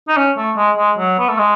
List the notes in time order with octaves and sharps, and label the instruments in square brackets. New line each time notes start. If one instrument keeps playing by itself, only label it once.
[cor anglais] D#4
C#4
A3
G#3
G#3
F#3
B3
A3
G#3